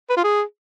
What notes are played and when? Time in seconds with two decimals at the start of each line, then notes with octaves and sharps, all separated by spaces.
0.10 B4
0.17 F4
0.24 G#4